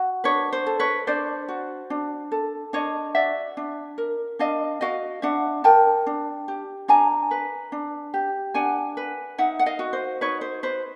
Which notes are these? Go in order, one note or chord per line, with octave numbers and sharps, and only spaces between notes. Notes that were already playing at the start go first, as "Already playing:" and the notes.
Already playing: F#4
D4 B4 C#5
C5
A4
B4 C#5
D4 C5 D5
F#4
D4
A4
D4 C#5 D#5
F#4 D5 E5
D4
A#4
D4 D#5 F5
F#4 D#5 F5
D4 E5 F#5
A#4 G5 A5
D4
G4
D4 G#5 A#5
B4
D4
G4
D4 F#5 G#5
B4
D#4 E5 F#5
F#5
D#5 F5
F#4
C5
D#4 B4 C#5
C5
B4 C5